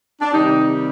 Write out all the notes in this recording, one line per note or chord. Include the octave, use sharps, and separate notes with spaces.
D4
C3 D#3 G3 D#4